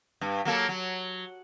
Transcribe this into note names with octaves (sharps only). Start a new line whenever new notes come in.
G2
F#3 A#3 A4
F#3